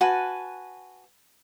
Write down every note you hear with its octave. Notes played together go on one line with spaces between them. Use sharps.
F#4 B4 G#5 A5